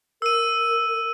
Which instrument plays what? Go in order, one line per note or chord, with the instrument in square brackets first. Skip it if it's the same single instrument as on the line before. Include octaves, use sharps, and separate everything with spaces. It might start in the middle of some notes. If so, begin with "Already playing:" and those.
[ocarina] A#4 [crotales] E6 D#7